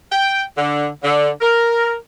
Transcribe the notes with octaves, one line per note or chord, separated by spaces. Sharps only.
G5
D3
D3
A#4